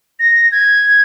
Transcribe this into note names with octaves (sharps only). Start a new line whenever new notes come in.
A#6
G#6